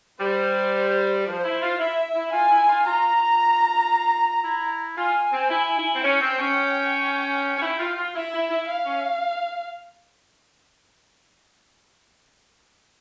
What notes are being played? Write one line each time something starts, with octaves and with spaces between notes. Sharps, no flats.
G3 C5
F3 C5
E4
F4
E4 E5
E4
F4 G#5
E4
F4
F4 A#5
F4
E4
F4 G#5
C4
E4
E4
C4
C#4 G5
C4
C#4
C#4
E4
F4
F4
E4 E5
E4
E4
F5
C#4